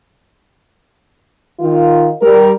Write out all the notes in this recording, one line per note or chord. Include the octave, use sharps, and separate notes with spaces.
D#3 F4
G3 A#4